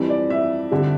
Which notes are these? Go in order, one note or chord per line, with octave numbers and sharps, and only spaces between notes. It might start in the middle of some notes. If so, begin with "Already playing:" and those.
Already playing: F2 E3 G3
D5
E5
F2 D3 G3